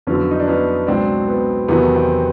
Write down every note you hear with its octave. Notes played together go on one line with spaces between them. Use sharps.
F2 D3 F#3 B3 C#4
D#4
D4
B3 C#4
C#2 B2 F#3 C4 D4
B3
E2 C3 D#3 F#3 B3
C4